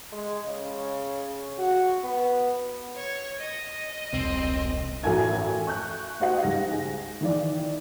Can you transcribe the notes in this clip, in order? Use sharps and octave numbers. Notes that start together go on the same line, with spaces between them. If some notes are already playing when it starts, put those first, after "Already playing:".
G#3
C#3
F#4
B3
C#5
D#5
E1 C2 C4
A1 F#4 A4 A#4 G#5 G#6
C#6 F#6 G6
F#4 G4 C5 D#5 F5 F#5
C#2 G#2 G3 A#6
G#4
D#3 E3 D5